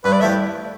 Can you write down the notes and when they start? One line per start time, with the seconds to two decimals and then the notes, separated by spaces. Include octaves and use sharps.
0.04 G2 B4
0.13 D5
0.21 F3 A3 E4 G4 E5